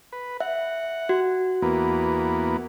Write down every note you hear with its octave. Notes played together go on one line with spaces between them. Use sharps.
B4
E5 F#5
F#4
E2 A#3 B3